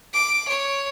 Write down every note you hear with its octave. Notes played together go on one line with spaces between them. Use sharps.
D6
C#5